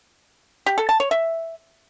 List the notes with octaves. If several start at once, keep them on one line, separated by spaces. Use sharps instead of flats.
G4
A4
A5
C#5
E5